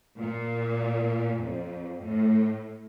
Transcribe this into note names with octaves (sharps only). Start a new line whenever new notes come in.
A#2
F2
A2